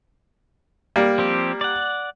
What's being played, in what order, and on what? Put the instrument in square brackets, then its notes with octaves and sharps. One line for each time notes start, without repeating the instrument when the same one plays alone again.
[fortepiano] G3 A#3
[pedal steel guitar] F3 C4 G4
D5 F#5